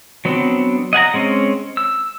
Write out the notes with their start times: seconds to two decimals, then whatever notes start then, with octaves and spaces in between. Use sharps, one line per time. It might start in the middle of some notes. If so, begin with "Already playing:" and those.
0.25 F#3 B3 C4 D4
0.93 D#5 F#5 G#5 A#5
1.14 G#3 C4 C#4
1.77 E6